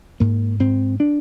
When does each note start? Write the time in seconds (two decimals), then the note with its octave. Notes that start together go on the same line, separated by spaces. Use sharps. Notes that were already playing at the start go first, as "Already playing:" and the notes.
0.20 G#2 A#3
0.60 G#2 C4
1.00 D4